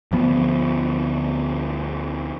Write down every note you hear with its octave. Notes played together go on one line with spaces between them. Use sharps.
D2 F3 B3